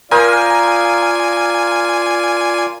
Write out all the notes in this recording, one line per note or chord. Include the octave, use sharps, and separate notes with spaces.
F4 A#4 C5 D5 F5 G#5 D#6